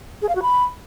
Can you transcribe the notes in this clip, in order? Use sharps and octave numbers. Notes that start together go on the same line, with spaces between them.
G#4
F5
F#4
B5